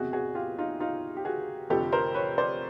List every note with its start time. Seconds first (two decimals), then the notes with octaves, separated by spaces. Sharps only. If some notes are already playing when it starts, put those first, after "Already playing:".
Already playing: F#1 E2 C3 F#4 G#4
0.13 F#4 G#4
0.35 F4 G4
0.58 D#4 F4
0.80 D#4 F4
1.17 G4
1.25 F#4 G#4
1.70 F1 F2 D3 F3 G4 A4
1.92 A#4 C5
2.14 B4 C#5
2.38 C5 D5